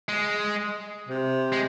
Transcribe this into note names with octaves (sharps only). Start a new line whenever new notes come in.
G#3
C3
G#3